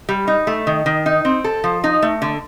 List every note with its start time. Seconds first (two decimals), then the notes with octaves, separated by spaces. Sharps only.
0.09 G3
0.27 D#4
0.47 A3
0.67 D#3
0.86 D#3
1.06 D#4
1.25 C4
1.44 A4
1.64 F3
1.84 D#4
2.02 A3
2.22 D3